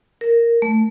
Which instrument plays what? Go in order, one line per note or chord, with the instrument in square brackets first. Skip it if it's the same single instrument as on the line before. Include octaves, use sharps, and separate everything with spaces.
[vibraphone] A#4
A3